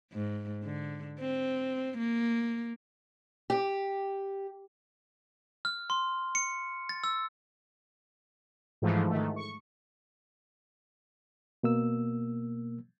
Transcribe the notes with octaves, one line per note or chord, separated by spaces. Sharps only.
G#2
D3
C4
A#3
G4
F6
C6
C#7
A6
E6
G#2 E3 F3 A3
G#2 D#3 A3
C#6
B2 A#3 E6